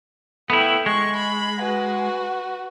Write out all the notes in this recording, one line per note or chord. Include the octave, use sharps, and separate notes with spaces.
A3 B3 E4 G5
G#3 C#6
B5
F#4 B4